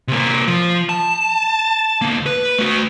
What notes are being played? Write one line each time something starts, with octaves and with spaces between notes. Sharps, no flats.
C3 A#3
F3
A5
D2 A#3
B4
A3 F#4